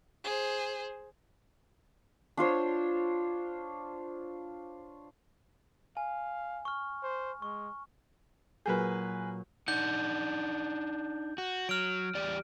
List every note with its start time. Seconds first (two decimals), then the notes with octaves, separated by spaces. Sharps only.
0.24 G#4 C5
2.37 D4 F4 C5 C#5
5.97 F5 G#5
6.65 C#6 F6
7.03 C5
7.42 G#3 C#6
8.66 A#2 F#3 G#4 A#4 B4 G6
9.68 D4 D#4 F#5 G6
11.38 F#4
11.69 F#3 F6 D7
12.15 E2 G4 D5